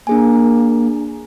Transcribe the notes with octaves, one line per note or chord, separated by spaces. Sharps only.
A#3 D4 G#4 G#5